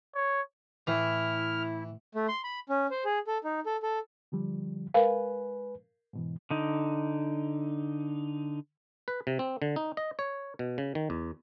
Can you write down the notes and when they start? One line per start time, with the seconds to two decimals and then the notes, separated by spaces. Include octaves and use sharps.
0.15 C#5
0.87 A2 E3 E4 F6
2.15 A3
2.28 C6
2.44 B5
2.69 C#4
2.91 C5
3.05 G#4
3.27 A4
3.44 D#4
3.66 A4
3.83 A4
4.32 D3 F3 G3
4.94 G#3 A#4 B4 F5 G#5
6.13 G#2 B2 E3
6.50 D3 D#4
9.08 B4
9.27 C3
9.39 C4
9.62 D3
9.76 D#4
9.97 D#5
10.19 C#5
10.59 B2
10.78 C#3
10.95 D#3
11.10 E2